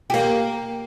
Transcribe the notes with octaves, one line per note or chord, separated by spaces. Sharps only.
A#3 G4